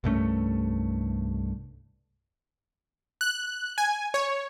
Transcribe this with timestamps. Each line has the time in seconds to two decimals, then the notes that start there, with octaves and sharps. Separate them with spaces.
0.04 C2 G2 A3 C#4
3.21 F#6
3.78 G#5
4.14 C#5